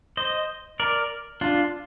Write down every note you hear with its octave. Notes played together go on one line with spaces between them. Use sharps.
C5 D#5
A#4 D5
D4 F4